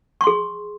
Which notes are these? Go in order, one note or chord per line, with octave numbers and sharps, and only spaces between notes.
G#4 C6 C#6